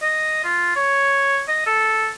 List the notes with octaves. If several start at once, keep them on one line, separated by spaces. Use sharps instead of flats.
D#5
F4
C#5
D#5
A4